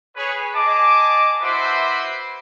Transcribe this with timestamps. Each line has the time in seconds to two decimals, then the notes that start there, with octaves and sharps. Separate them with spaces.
0.16 G#4 B4 C#5
0.54 G#4 D#5 A5 D6
1.42 E4 F#4 B4 C5 E5 D6